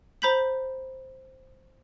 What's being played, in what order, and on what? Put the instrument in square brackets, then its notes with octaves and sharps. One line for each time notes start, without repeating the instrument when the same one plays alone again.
[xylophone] C5 A#5 B5 G6 B6 F#7